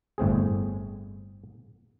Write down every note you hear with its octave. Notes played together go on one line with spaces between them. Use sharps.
G1 A2 C4 G#4